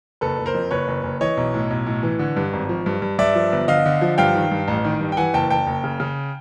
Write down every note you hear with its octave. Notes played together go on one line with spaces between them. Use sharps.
F#1 A4 B4
F#1
A#4 C5
F2
F#1 B4 C#5
F#1
F#1
E3 C#5 D#5
B1
A2
B1
A2
E3
D3
G2
G#1
F3
G2
G2
G2 D5 E5
F3
G1
D3 D#5 F5
D3
F3
G2 F5 G5
D#3
G2
A1
D#3
G2
G5
E3 F#5 G#5
F#1 G5 A5
F#1 G5 A5
F#1
C#3
C#3